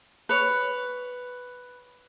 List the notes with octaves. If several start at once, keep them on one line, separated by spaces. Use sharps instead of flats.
B4 C#5